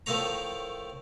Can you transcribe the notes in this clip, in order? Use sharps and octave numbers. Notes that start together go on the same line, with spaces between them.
A2 D#3 F3 A3 C#5 A#5